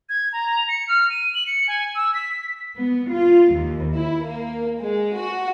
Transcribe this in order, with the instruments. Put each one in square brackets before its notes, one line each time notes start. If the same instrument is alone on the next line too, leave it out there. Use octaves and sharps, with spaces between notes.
[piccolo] G#6
A#5
C#7
F6
D#7
F#7
C#7
G#5
E6
B6
[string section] B3
F4
D#2
E4
A#3
G#3
F#4